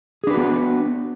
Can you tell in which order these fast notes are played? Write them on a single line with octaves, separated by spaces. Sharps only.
G#4 D4 B4 F#4 B3